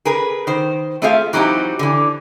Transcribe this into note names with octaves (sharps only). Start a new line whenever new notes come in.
G#4 A#4 B4
D#3 C5
A3 C4 F4 G#4 E5 F5
E3 F#3 C4 D#4 G4
D3 E3